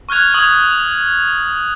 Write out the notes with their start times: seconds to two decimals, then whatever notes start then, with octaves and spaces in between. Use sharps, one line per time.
0.09 C#6 F6 F#6 G#6 F7
0.34 C#6 D#6 G#6 F7 F#7